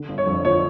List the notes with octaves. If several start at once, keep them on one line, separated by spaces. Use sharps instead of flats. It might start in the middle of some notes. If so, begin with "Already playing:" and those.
Already playing: D3
G1
C#5
F2
F3 C#5